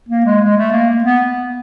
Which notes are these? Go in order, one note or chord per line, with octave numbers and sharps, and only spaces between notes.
A#3
G#3
G#3
A3
A#3
B3